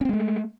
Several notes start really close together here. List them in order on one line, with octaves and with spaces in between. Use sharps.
C#4 C4 G#3 A3